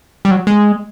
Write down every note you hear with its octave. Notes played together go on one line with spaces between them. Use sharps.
G3
F#3
G#3